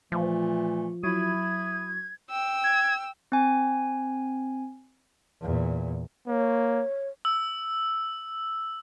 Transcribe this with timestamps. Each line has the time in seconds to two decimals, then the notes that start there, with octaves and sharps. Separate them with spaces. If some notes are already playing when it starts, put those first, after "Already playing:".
0.12 A#2 E3 F3 A3
1.04 F#3 E4 D#6 G#6
2.30 G5 E6
2.64 G#6
3.32 C4 G#5
5.41 E2 A#2
6.27 A#3 C#5
7.25 E6